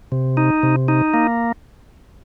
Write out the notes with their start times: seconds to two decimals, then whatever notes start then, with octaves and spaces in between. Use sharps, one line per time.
0.12 C3
0.37 D#4
0.63 C3
0.88 D#4
1.14 A#3